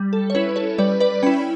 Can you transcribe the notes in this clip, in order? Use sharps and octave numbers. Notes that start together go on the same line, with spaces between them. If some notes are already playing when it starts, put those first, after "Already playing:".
Already playing: G3
A4
C#5
C#4 E4 B4
A4 C#5
G3 B4 D5
B4 D5
C#4 E4 G5 B5